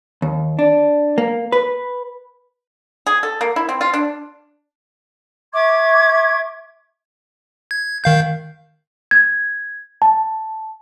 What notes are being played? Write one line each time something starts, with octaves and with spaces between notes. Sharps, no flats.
D#2
D4
A#3
B4
G#4
A4
A#3
E4
C4
F4
D4
E5 C#6 D6 G#6
G#6
D#3 F5 G6
G#6
A5